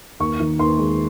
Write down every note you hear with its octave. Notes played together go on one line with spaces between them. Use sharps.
D#2 C#6
D#3
D#2 C6
G#3